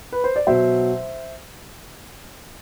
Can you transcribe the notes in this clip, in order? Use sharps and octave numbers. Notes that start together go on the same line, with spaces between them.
B4
C5
D5
B2 F#3 C5 E5